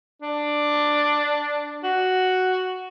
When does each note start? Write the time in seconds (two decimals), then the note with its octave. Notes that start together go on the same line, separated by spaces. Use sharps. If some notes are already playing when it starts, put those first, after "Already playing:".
0.22 D4
1.84 F#4